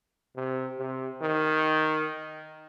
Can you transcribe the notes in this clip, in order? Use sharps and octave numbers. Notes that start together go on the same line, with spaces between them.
C3
C3
D#3